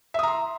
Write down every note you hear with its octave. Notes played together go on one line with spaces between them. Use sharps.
E5 A#5 C6 D#6